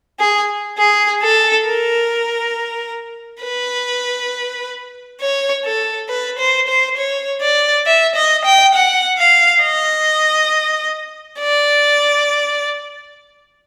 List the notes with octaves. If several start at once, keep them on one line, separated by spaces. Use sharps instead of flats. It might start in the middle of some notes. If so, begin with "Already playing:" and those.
G#4
G#4
A4
A#4
B4
C#5
A4
B4
C5
C5
C#5
D5
E5
D#5
G5
F#5
F5
D#5
D5